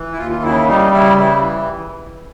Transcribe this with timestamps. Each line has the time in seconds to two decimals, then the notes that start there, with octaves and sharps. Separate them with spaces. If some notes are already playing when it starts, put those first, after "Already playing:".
Already playing: E3
0.12 E4
0.18 D#2 F4
0.31 F4
0.43 C#3 E4
0.68 G3 D#4
0.92 C#3 E4
1.18 E3 E4